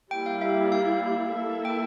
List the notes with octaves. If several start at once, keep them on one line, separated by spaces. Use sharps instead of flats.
G3 A#3 E4 G4 G5
F5
E5
F5
A#3 E4 A4 E5
G5